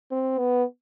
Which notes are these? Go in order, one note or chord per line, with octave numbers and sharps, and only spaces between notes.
C4
B3